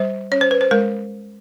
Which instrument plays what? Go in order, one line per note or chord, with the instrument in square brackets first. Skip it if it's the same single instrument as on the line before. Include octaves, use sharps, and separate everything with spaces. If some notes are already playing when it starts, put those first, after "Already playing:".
Already playing: [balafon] G3 C5
C#4 C#5
C5
B4
C5
G#3 A#4